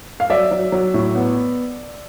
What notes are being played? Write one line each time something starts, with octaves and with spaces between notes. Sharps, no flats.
F5
F#3 D5 E5
F#3
F#3
A2
B3